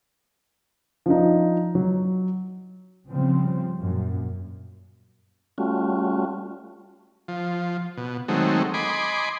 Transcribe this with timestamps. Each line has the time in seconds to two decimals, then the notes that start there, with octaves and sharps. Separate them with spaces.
1.06 F3 D4 D#4
1.75 F#3
3.09 C#3 F3 G3 C4
3.79 F#2 A#2
5.58 G3 A3 C#4 F4 F#4
7.28 F3
7.97 B2
8.28 D#3 F#3 G#3 A3 C4
8.74 D#5 G#5 B5 C6 D6